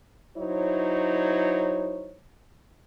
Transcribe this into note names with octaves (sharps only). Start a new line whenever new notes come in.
F#3 D#4 E4 C5 C#5